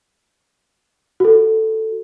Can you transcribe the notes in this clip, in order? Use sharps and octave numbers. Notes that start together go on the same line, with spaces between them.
F#4 A4